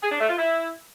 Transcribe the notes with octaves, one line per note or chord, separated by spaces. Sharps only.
G#4
D4
A3
F4
E4